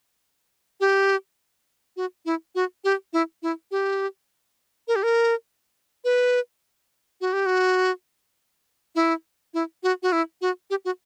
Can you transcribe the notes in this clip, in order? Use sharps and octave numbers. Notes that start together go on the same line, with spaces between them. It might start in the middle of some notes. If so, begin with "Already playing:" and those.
G4
F#4
E4
F#4
G4
E4
E4
G4
A#4
G4
A#4
B4
F#4
G4
F#4
E4
E4
F#4
F#4
E4
F#4
G4
F#4